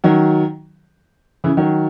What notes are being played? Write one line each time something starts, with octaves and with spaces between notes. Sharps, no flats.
D#3 F#3
C#3 E3
D#3 F#3